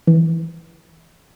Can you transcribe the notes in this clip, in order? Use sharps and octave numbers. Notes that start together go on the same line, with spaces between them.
E3